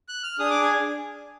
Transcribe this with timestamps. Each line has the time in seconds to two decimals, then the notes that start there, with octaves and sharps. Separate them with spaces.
0.09 F#6
0.23 F6
0.39 D4 G#4 D#6
0.50 D6
0.62 G#5